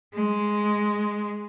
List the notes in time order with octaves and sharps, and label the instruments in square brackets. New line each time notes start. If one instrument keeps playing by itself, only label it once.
[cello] G#3